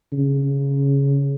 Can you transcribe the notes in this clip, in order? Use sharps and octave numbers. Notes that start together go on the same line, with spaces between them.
C#3